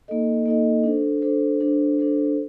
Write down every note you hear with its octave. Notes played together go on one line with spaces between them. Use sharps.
A#3 D#4 A4 D#5
A#3 D#4 A4 D#5
D4 A4 C5
D4 A4 C5
D4 A4 C5
D4 A4 C5